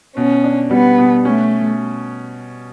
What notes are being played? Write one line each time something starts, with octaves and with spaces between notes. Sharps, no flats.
B2 C#4
D4
G3 B3
B2
A3 C#4